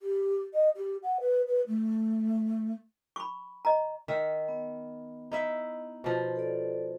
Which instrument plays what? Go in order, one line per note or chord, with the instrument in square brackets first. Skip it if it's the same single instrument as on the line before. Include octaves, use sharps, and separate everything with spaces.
[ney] G4
D#5
G4
F#5
B4
B4
A3
[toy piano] B5 C#6
D#5 A#5
[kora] D#3 E5
[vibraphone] B3
[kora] D#4 E4 E5
B2 F3
[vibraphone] A4 D5